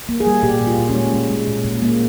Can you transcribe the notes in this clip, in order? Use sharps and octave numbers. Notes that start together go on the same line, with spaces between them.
A#3
G#4
G3
A#2 G4
A#2
F4
A#2
C#4
G#3
G#3
G#3
A#2
A#2
G#3 A#3